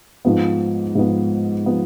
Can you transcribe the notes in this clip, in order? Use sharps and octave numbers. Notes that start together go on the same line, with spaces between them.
G#2 F3 B3
G#2 F3 B3
F3 B3